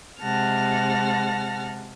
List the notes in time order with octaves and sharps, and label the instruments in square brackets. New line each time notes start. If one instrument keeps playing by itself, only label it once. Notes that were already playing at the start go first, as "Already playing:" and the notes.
[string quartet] C3 G#3 F#5 A5 F6 A#6